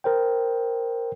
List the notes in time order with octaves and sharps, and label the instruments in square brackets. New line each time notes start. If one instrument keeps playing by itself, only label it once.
[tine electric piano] A#4 C5 G5